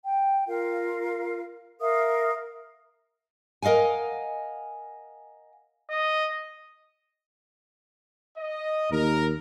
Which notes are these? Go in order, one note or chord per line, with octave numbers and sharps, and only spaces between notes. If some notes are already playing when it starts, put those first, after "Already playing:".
G5
F4 A#4 F5
A#4 E5 F5 D#6
A#4 D#5 F5 F#5 G#5
D#5
D#5
D#2 A#4